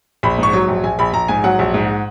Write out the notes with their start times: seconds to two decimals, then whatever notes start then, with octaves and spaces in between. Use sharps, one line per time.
0.23 A#1 B5
0.38 G#2 C#6
0.53 F#3
0.68 A#1
0.83 A#1 G#5
0.99 A#1 B5
1.13 A#1 A#5
1.28 G#2 G#5
1.44 F#3 F#5
1.59 A#1
1.74 G#2